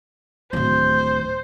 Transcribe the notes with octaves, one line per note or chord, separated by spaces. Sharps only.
D1 D#3 C5